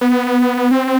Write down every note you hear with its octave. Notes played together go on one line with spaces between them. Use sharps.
B3
C4